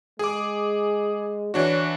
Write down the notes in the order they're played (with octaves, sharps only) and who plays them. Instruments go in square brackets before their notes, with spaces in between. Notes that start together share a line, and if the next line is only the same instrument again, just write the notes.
[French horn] G#3 [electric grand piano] G#4 D6
[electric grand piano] E3 D4 F#4 [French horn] C#5